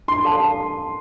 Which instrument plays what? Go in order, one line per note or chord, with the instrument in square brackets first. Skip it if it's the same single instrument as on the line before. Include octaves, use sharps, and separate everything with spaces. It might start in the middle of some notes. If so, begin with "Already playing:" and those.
[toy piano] D4 [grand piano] C6
[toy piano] A4 F5 A5